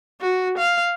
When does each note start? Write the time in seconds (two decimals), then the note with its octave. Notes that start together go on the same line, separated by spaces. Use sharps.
0.21 F#4
0.58 F5